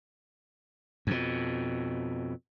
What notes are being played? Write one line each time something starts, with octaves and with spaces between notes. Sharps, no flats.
F2 B2